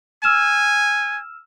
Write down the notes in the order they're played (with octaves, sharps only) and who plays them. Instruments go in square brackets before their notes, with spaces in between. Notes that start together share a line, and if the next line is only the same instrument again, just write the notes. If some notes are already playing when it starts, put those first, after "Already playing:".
[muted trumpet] G#5 [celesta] E6 F6 E7